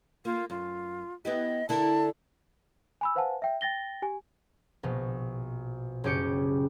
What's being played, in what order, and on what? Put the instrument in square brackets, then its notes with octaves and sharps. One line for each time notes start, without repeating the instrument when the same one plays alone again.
[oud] A#3 [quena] F4
[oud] F#2 [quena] F4
[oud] B3 E4 G4 [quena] D#5
[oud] D3 E4 A#4 [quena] A5
[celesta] G#5 B5 E6
B4 C5 F5 F#5 G#5 A5
E5 G5
G5 A6 A#6 G7
G4 G#5
[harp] A#1 B2
F#1 C#3 C#4 G4 G5 C#7